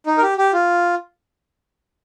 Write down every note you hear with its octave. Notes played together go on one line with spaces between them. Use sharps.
D#4
A#4
G4
G4
F4